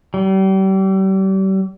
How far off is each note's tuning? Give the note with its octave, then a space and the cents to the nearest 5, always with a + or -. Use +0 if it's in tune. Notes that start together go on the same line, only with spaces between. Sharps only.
G3 -35